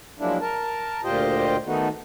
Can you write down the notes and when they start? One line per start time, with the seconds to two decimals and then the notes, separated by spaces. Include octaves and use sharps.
0.19 F3 F#3 G#3 A#3 D4 E4
0.41 A#4 A5
1.04 D2 A#2 F4 G4 C5 D#5
1.66 D#3 A3 B3 D#4 F#4